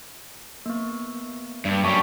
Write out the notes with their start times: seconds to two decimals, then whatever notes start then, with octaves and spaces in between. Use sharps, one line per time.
0.66 A#3 B3
1.65 G2
1.84 F#2 G3 A5 C#6 D6